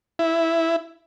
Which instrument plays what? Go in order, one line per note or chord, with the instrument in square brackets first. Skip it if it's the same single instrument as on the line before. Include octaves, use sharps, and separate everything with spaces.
[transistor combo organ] E4